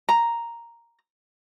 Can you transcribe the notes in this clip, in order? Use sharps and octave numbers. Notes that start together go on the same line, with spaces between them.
A#5